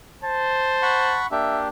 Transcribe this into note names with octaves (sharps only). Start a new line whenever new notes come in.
C5 A5
F#5 B5 C#6
A#3 D4 G4 E5